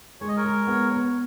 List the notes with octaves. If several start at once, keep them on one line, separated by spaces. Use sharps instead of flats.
G#3 C#5
D#5
A#4 C#5
G#3
B3
B3